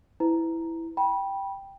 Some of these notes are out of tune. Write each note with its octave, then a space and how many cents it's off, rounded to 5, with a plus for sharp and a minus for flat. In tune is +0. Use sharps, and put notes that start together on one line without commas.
E4 +0 B4 +35 A#5 +0
G5 +0 B5 -25